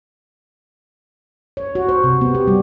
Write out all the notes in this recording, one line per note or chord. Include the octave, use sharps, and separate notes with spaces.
C#5
F#4
C5
C3
B3
G4
G3